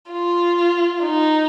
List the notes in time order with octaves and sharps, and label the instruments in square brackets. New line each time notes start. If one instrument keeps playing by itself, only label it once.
[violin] F4
D#4